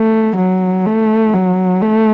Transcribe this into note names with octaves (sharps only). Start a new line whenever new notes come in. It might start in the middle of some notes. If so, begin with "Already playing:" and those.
Already playing: A3
F#3
A3
F#3
A3